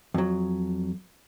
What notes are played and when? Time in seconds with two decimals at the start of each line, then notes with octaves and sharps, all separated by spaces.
0.14 F2 F#3